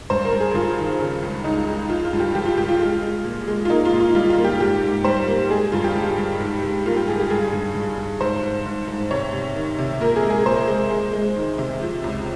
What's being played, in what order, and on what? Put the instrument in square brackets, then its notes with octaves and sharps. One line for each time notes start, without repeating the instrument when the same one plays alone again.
[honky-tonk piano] G2 C5
A#4
G2
G#4
G2 F4
D#3
C#3
C#2
C#2 D#4
G#3
F3 F4
F4
G2
G4
F3 G4
F4
G2 G4
F4
G#3
G#3
A#2
G#3
F4
A#3 D#4
F4
A#2
F4
G3 F4
F4
A#3
G4
G#2 G4
G#2
G3 C5
A#3
G#3 G#4
G2 F4
G4
G2
G2
G#2
G#2
A#3 F4
G4
G#2 G#4
G4
G2 G#4
G2
G2
G2
G#2 C5
G#2
G#2
G#2
C3 C#5
C3
D#3
C3
A#2 A#4
G#4
G#3
G#4
A#2 C5
G#3
G#3
G#3
D#3
C3
F3
C#2